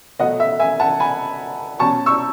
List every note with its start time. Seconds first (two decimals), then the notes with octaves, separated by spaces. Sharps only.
0.19 B2 F#3 A3 D#5 F#5
0.40 E5
0.59 E5 G#5
0.80 F#5 A5
1.00 G#5 B5
1.79 B2 F#3 C#4 A5 C#6
2.06 C#6 E6